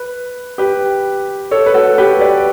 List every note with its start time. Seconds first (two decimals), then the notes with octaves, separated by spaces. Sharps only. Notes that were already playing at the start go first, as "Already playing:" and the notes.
Already playing: B4
0.58 G4 B4
1.51 A4 C#5
1.66 B4
1.74 F#4 A4
1.98 G4 B4
2.21 B4 D5